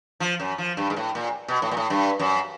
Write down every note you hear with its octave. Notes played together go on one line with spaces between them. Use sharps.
F3
F#2
F3
G2
G#2
A2
A#2
B2
A2
A#2
A2
G2
F#2